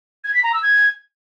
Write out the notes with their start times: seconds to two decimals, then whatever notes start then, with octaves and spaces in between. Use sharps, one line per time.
0.24 G#6
0.34 B6
0.43 A#5
0.53 E6
0.63 G#6